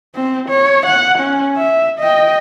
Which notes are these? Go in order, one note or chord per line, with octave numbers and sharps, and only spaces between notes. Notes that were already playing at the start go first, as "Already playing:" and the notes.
C4
C#5
F#5
C#4
E5
D#5 G5